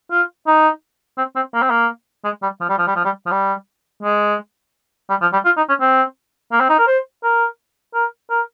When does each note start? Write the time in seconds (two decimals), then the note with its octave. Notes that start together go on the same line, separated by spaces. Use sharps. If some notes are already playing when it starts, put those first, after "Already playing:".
0.11 F4
0.47 D#4
1.18 C4
1.36 C4
1.54 A#3
1.62 C4
1.70 A#3
2.24 G#3
2.42 G3
2.60 F3
2.69 G3
2.78 F3
2.87 G3
2.96 F3
3.05 G3
3.26 F3
3.31 G3
4.03 G#3
5.10 G3
5.21 F3
5.33 G3
5.45 F4
5.57 D#4
5.69 C#4
5.81 C4
6.52 A#3
6.60 C4
6.69 D#4
6.78 A#4
6.87 C5
7.23 A#4
7.94 A#4
8.30 A#4